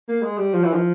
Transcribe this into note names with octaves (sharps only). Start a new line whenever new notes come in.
A#3
G#3
G3
F3
E3
F3